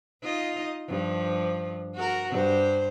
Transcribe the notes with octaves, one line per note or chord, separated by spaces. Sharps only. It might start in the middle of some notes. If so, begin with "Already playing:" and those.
D#4 F4 D#5
G2 F3
F#4 A#4
G2 C5